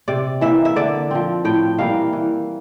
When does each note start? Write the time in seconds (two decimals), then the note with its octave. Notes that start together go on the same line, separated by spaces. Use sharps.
0.08 C3 D5
0.41 E3 A#3 E5
0.65 E5
0.76 D3 D5
1.11 F3 C4
1.45 A2 G5
1.79 E3 G3 A#3 F5
2.13 E3